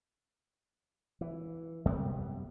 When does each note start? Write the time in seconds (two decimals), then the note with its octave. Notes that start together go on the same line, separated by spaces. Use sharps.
1.21 E3
1.85 F#2 C3 G3 B3